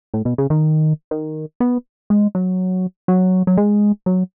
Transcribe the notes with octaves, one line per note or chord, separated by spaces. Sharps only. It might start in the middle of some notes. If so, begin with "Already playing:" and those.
A2
B2
C#3
D#3
D#3
B3
G#3
F#3
F#3
F#3
G#3
F#3